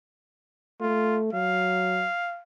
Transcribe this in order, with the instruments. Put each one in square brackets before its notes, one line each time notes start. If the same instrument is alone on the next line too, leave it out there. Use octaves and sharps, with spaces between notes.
[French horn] A3 [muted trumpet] F4
[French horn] F#3 [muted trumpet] F5